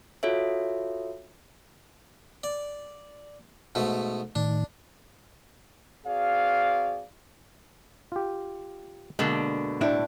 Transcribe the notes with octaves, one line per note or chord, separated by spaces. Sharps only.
F4 F#4 A4 C#5 E5
D5
G#2 B2 A3
A2 D#3 D4
C4 F#4 G#4 D5 F5
F4 G4
B2 D3 G#3 A#3
A2 D4 E4